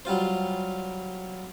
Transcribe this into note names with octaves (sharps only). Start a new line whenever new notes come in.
F#3 G3 F4 C5